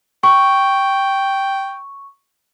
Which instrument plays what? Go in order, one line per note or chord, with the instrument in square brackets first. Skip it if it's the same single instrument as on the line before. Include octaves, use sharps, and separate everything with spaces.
[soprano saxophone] G5 [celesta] C#6